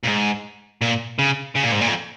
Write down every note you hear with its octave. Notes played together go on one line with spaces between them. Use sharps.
A#2
G#2
A#2
C#3
C#3
A#2
G#2
A#2
F2